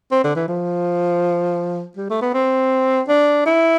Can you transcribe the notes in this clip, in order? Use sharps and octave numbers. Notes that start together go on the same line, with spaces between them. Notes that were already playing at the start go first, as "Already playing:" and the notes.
C4
D3
E3
F3
G3
A3
B3
C4
D4
E4